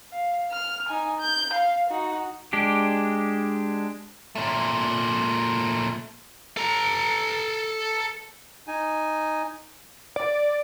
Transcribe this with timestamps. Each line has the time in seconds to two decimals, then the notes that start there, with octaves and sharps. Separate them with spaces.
0.12 F5
0.51 F6
0.89 D#4 G#5
1.20 G6
1.54 F5
1.90 D#4 F#4
2.53 G#3 D4 G4
4.35 A#2 A3
6.57 A4 A#5
8.68 D#4 G#5
10.16 D5